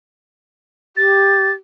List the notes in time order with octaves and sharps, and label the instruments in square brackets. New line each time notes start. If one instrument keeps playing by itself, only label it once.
[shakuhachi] G4 [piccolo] A6